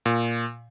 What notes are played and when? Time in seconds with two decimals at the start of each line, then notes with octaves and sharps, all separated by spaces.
0.06 A#2